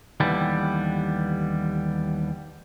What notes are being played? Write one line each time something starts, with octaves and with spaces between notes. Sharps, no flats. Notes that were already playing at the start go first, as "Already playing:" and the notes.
D#2 D3 E3 G3 B3